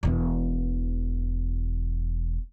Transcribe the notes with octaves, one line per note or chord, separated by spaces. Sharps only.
E1 E3